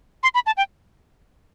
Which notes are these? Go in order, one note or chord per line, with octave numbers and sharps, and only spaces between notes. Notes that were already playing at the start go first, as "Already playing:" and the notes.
C6
B5
A5
G5